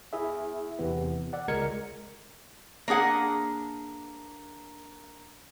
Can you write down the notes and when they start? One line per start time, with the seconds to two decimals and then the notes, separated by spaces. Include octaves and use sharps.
0.13 E4 G#4 E5
0.79 E2 C3 E3 B3
1.33 D5 F#5
1.48 C#2 G#3 A#4 G#6 C#7
2.88 A#3 D4 G#4 F#5